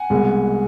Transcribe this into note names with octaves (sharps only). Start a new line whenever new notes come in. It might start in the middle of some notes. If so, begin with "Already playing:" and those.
Already playing: F#5 G#5
C2 B2 G#3